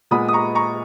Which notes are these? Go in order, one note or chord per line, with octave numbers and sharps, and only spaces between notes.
A#2 G#3 B3 B5 D#6
D#6
A#5 C#6
A#5 C#6